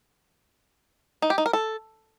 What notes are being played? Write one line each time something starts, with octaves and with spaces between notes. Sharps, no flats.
D#4
G4
D#4
A#4
A4